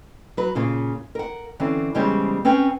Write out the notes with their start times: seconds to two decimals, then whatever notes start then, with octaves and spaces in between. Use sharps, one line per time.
0.37 F#3 B4
0.55 A#2 C#3 F4
1.15 A#4 F#5
1.60 D3 E3 C4 C#4
1.95 E2 C#3 G3 G#3 C#4 C5
2.45 C4 C#4 B4 G5